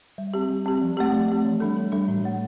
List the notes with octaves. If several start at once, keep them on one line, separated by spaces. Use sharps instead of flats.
G3
C4 G4
G3
C4 G4
F3
A3 C4 G4
F3
A3 C4 G4
E3
G3 D4 A4
E3
G3 D4 A4
A2
E3 A3